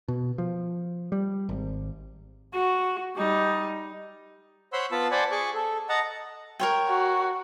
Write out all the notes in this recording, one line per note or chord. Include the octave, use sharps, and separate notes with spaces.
B2
F3
G3
G#1
F#4
G3 D#4
C5 C#5 F#5 B5 C6 E6
B3 F4 A5 B5 E6
C5 D5 F#5 G#5 A5 B5
G#4 G#5 C#6 D6
A4
D#5 F#5 A5 A#5
A#4 C#5 G5
F#4